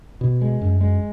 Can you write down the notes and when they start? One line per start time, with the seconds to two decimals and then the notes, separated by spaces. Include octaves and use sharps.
0.21 B2
0.41 G#3
0.61 F#2
0.81 G#3